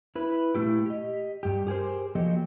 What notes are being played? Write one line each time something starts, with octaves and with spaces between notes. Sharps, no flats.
E4 B4
A#2 C#3 A3 E4 G4
G4 D#5
G2 G4
G4 G#4 A#4 C5
F3 F#3 A#3 G4 A4 D#5